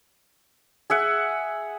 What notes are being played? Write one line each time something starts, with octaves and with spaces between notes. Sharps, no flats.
G#4 E5 F#5